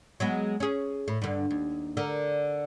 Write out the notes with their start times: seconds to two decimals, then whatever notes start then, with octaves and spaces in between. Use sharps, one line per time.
0.20 F#3 G#3 B3
0.60 C#4 G#4
1.08 A2
1.22 G2 D3
1.50 D#2
1.97 D3 A#4